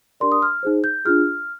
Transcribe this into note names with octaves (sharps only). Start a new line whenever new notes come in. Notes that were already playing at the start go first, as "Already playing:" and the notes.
D4 G4 A#4 D5 C6
D#6
F6
D#4 G#4 C5
G6
D4 F4 G#4 F6